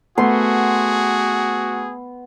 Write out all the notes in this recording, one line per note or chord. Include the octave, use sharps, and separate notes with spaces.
A3 B3 F#4 G#4 C6